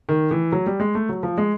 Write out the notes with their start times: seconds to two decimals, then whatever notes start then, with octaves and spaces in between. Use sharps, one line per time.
0.09 D#3
0.31 E3
0.52 F#3
0.67 G3
0.80 G#3
0.95 A3
1.09 F#3
1.23 F3
1.38 G#3